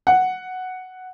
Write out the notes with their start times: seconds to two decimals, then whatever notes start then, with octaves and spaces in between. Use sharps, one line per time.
0.07 F#5